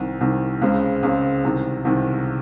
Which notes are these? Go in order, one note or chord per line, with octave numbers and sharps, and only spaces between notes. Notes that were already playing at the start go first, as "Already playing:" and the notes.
Already playing: C2 C3 D#3
C2 C3 D#3
C#2 C#3 G#3 C4
C#2 C#3 G#3 C4
C2 C3 D#3
C2 C3 D#3